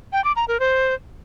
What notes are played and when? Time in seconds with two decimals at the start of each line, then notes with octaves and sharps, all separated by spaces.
0.13 G5
0.24 D6
0.36 A#5
0.48 A#4
0.60 C5